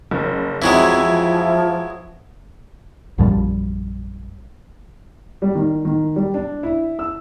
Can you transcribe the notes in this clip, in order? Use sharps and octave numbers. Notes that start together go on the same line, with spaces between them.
F#1
F2 E3 F#3 G#3 C4 E4 E5
F3
A#1 F#2 F3 G3
G3
D#3
D#3
G3
D4
E4
E6